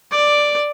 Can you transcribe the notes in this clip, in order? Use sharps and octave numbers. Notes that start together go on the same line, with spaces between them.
D5